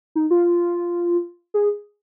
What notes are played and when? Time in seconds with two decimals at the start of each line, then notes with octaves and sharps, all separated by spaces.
0.15 D#4
0.31 F4
1.54 G#4